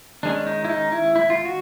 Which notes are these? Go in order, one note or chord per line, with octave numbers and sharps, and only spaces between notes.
D#3 G#3 C#4 D4
D#4
E4
D#4
E4
E4
F4
F#4